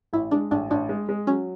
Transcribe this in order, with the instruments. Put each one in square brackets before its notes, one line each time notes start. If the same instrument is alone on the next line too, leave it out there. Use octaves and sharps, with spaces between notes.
[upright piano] A1 [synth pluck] E4
[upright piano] G#3 [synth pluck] D4
[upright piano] A1 [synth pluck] D4
[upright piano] A1 [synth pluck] D4
[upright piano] G#3
G#3
[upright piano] F#3 [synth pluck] C#4